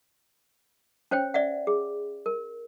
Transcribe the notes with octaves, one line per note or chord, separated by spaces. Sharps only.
C#4 C5 C#5 G5
D5 E5 F#5
G#4
A#4